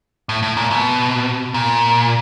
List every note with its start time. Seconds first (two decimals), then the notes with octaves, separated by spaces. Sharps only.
0.29 A2
0.43 A2
0.57 A#2
0.71 B2
1.54 A#2